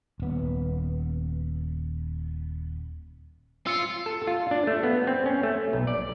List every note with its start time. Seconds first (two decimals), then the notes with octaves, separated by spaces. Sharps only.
0.20 D#1 B3
3.67 F4 E6 C#7
4.06 A4
4.27 F4
4.51 D4
4.67 A3
4.83 B3
5.07 C4
5.26 C#4
5.43 A3
5.73 B1
5.87 D5